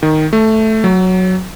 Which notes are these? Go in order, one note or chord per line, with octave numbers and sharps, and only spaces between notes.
D#3
A3
F#3